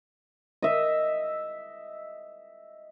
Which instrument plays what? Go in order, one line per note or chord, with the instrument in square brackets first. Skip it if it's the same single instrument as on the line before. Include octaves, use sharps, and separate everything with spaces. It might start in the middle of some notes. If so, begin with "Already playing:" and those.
[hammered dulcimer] D#5 E5